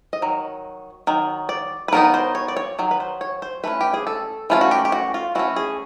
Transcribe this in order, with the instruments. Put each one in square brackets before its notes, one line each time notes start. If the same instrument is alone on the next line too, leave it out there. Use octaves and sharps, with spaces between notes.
[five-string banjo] D#5
D#3 F#3
D#3 F#3
D5
B4
D#3 F#3 B3 D#4 A#4
C5
C#5
D5
C#5
D#3 F#3
B4
C5
C#5
C5
E3 A3 C#4 B4
G4
G#4
A4
E3 A3 C#4 F4
F#4
G4
G4
F#4
F4
E3 A3 C#4 F#4
G#4